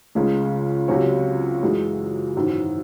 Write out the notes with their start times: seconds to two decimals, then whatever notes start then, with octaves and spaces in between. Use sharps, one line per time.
0.15 C#2 C#3 G#3
0.88 C#2 C3 F#3 C#4
1.63 F#2 E3 G#3
2.36 G#1 F#2 E3